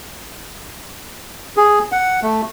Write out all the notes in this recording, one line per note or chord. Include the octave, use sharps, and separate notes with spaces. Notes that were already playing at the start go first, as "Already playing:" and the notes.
G#4
F#5
A3